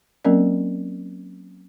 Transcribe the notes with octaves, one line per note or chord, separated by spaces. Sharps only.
F#3 A#3 C4 C#4 A#4 D5